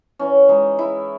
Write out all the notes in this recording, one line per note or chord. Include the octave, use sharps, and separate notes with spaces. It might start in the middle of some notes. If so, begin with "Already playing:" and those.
E3 C#4
G#3 D#4
G#3 E4